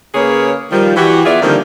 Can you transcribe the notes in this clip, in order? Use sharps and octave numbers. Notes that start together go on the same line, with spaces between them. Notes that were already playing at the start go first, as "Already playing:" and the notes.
C#3 A#3 G#4 B4 C#5
D#3 F3 G3
E3 F#4 G4
B3 F4 G#4 D5 E5
D3 D#3 F3 G3 A#3 C4